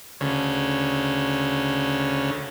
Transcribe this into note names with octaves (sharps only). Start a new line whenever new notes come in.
D2 C#3